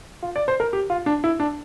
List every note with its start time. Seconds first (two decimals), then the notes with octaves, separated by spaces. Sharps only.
0.23 F4
0.36 D5
0.48 C5
0.60 A#4
0.73 G4
0.90 F4
1.06 D4
1.24 E4
1.40 D4